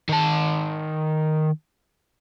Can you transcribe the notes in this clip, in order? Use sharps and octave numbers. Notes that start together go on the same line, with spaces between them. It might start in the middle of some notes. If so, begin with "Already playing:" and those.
D#3 A5